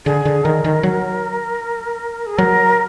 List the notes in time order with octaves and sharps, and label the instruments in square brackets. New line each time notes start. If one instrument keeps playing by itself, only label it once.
[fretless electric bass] D3 [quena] G#4
[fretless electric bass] D3
[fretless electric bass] D#3 [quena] A#4
[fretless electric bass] D#3
F#3
[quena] G#4
[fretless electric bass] F#3 [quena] A#4